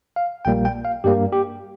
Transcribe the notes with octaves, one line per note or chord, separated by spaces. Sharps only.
F5
A#1 A#2 G3 A#3 G5
G5
F5
G2 G3 A#3 G4
G4